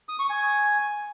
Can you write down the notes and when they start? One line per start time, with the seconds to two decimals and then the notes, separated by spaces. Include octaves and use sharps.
0.09 D#6
0.19 C#6
0.30 G#5